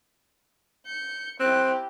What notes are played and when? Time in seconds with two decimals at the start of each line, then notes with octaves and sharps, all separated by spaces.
0.86 G6 C#7
1.40 C4 E4 G4 F#6